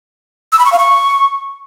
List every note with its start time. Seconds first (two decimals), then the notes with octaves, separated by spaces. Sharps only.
0.52 E6
0.59 B5
0.66 C#6
0.72 F5
0.79 C#6